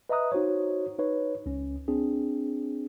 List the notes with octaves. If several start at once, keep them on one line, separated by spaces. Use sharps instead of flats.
B4 D#5 E5 A#5 D#6 F#6
D#4 F#4 C5 C#5
D#4 B4 C#5
C#2 C#4
C4 D4 G#4